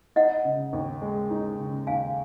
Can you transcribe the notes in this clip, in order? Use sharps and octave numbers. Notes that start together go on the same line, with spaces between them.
D#4 D#5 F#5
C#3
D#2
G#3
D#4
C#3
D#2 F5 G#5